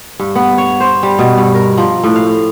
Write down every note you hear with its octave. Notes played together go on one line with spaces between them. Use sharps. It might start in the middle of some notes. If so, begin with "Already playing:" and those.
G2
B3
C#5
C5
G3
B2
G2
A#4
F3
A2
F5